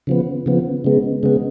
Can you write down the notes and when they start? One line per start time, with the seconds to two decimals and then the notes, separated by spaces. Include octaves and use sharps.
0.07 C#3 F3 B3
0.46 C#3 F3 B3
0.84 C#3 G#3 B3
1.23 C#3 G#3 B3